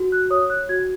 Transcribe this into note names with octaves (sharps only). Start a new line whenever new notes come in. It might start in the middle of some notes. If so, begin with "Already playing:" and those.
Already playing: F#4
F#6
C#5 D#6
F#6
F#4 G#6